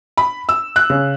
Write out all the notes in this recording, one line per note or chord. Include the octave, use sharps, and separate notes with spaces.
B5
E6
F#6
C#3